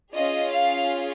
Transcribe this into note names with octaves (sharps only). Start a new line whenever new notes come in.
C#4 F4 G#4 D#5
F5